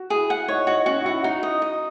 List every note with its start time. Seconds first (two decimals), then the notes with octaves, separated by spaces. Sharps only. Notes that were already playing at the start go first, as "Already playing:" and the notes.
Already playing: F#4
0.10 E4 G#4
0.30 F#5
0.48 D#4 C#5
0.67 D#4 F#4
0.86 C#4 F#4
0.97 D#4
1.05 E4 F#4
1.24 D#4 F#4
1.43 D#5
1.62 D#5